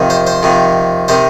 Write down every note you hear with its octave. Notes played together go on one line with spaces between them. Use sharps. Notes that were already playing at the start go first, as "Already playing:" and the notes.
Already playing: F2 C3 D#3
C5
C5
F2 C3 D#3
C3 D#3 C5